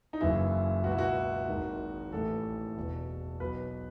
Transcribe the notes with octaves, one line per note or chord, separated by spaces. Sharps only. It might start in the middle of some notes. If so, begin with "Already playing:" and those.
D#4
F#1 F#2 C#3 E3 E4
C#2 B2 F#4
E4
F#4
G#1 G#2 D#3
A1 A2 E3 A4
E1 E2 B2
B1 B2 B4